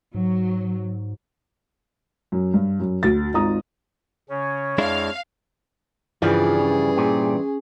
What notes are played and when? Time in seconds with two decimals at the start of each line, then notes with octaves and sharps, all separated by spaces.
0.15 G#2 F#3
2.32 F#2
2.54 G2
2.80 F#2
3.03 D2 F#4 A6
3.34 G#1 D#4 F4 A#5 D#6
4.29 C#3 C#4 C#5
4.78 F2 G#3 D4 E4 F5
6.22 G2 C#3 E3 F3 G3 F4 G#4 D5
6.59 C#4
6.97 A#2 G3 C4